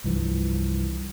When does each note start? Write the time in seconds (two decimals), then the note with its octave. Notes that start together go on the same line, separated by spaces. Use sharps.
0.04 C2 G2 E3 F3